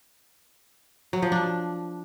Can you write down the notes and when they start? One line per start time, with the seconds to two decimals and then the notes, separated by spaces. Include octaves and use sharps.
1.13 F#3
1.22 F3
1.32 D4